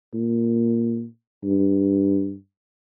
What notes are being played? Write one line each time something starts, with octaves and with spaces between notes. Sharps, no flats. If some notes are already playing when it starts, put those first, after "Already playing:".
A#2
G2